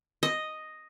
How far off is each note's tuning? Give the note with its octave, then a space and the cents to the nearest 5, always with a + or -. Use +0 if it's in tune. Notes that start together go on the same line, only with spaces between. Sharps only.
D#5 +0